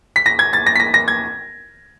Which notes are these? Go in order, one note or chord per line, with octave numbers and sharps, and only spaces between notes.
B6
A#6
G#6
A6
A#6
B6
A#6
A#6
G#6